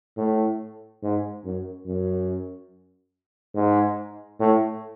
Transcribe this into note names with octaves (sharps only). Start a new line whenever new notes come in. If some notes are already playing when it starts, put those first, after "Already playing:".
A2
G#2
F#2
F#2
G#2
A2